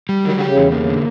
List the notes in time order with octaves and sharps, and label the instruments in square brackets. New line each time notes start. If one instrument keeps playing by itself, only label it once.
[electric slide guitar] G3
[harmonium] D#3 [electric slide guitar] F#3
[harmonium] D3
[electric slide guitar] G4
[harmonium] C#3
[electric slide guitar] E2
A#3
D3